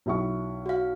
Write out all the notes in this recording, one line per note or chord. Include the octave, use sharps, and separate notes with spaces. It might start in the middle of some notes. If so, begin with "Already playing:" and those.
B1 E4 C#6
F#4 F5